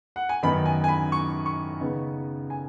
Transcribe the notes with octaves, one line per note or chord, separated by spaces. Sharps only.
F#5
G#5
F#2 D#3 B3 D#4 B5
G#5
G#5
B5
C#6
C#6
C#3 B3 D#4
G#5